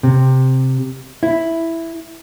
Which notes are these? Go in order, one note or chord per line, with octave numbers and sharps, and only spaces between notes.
C3
E4